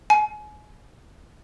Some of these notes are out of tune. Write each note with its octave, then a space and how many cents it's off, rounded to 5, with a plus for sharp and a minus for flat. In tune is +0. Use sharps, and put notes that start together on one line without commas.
G#5 +30